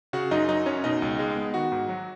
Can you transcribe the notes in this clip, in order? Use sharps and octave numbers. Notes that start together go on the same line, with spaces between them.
C#3 F#4 F#5
F#2 D#4 D#5
F#3 D#4 D#5
F#2 C#4 C#5
B2 D#4 D#5
C#2
G#3
B3
D#3 F#4 F#5
G#2
F#3